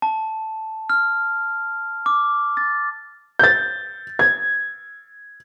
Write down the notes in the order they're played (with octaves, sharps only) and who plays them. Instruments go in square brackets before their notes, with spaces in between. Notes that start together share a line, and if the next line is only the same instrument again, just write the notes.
[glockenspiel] A5
F6
D6
A6
[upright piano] G6 A6
G#6